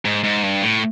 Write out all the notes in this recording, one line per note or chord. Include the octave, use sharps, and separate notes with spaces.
G#2
G#2
G2
A2